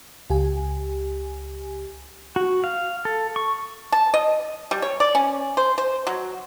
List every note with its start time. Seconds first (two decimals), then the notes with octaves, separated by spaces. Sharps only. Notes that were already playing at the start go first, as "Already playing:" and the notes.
0.30 C#2 G4 G#5
2.36 F#4
2.64 F5
3.05 A4
3.36 C#6
3.92 A5
4.14 D#5
4.71 G3
4.82 C#5
5.00 D5
5.15 C#4
5.57 C5
5.78 C5
6.07 F#3